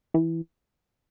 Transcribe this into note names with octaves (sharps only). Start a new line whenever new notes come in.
E3